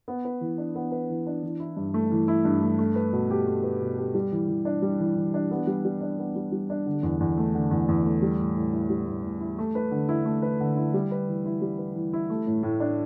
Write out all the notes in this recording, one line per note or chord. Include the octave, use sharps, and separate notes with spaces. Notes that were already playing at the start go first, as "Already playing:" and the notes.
B3
B4
E3
D4
B3
B4
E3
D4
E3
E4
G2
A3
E3
E4
G2
A3
A3
B4
B2
G4
A3
B4
B2
G4
G3
E3
E3
D4
G3
E3
E3
D4
B3
G3
G3
D4
B3
G3
G3
D4
D3
E2
E2
A3
D3
E2
E2
A3
G3
A2
A2
E4
G3
A2
A2
E4
A3
B4
D3
E4
A3
B4
D3
E4
G3
B4
E3
E4
G3
B4
E3
E4
A3
A2
A2
D4